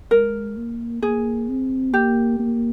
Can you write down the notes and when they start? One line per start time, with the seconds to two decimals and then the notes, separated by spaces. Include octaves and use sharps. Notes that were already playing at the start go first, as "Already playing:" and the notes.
0.11 G#3 A#4
0.57 A#3
1.02 A#3 G#4
1.49 C4
1.94 A#3 G4
2.39 A#3